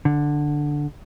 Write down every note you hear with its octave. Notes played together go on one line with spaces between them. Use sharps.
D3